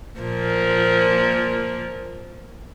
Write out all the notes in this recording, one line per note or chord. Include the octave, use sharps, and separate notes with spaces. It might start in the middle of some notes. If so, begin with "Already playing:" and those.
A#2 F3 A#3